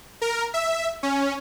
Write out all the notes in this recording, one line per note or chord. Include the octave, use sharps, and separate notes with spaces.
A#4
E5
C#4